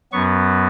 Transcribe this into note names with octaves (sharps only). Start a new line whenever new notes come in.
F#2 F#3 B3 C#6